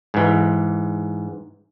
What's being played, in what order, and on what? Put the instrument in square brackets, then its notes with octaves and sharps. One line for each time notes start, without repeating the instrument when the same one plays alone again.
[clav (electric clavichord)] G#2 E3